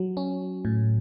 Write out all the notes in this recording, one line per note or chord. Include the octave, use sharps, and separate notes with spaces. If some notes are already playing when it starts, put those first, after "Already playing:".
Already playing: F#3
C#4
A2